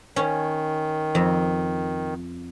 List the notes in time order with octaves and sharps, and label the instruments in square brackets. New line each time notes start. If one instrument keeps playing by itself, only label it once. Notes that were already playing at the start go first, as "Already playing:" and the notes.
[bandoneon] D#3 [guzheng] C#4
[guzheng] F2